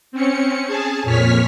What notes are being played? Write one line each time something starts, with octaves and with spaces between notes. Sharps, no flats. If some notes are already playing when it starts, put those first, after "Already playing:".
C4 C#4 C#7
G#4 G#5 A5
F2 A#2 C#5 F6 B6